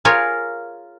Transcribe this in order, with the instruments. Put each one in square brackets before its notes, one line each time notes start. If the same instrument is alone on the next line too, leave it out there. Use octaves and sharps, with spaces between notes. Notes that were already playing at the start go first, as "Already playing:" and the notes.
[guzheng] F4 G#4 A#4 C#5